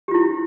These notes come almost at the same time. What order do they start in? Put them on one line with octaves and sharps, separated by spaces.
G4 F4 E4